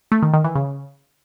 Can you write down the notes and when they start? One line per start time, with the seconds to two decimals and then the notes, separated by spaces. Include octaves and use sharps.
0.12 A3
0.23 D#3
0.33 D#3
0.44 E3
0.55 C#3